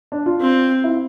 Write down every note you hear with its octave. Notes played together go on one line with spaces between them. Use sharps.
D4
F4
C4
E4